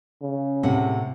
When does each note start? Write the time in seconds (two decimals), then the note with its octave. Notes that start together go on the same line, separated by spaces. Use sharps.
0.22 C#3
0.63 A2 C3 F#5